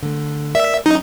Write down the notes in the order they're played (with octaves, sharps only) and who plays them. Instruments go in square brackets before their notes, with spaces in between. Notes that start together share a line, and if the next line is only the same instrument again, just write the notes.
[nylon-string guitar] D3 A3
[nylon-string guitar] A#4 D5 [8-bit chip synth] E5
[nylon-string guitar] F#3 C#4 [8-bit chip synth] D#4